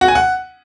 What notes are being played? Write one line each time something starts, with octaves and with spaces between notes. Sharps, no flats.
F#4
G#5
F#5